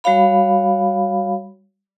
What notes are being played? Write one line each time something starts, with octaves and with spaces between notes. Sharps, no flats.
G3 F#4 C#5 F5 B5